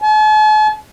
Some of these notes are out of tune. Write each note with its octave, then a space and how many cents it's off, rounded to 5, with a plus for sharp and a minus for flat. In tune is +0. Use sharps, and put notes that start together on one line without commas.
A5 -45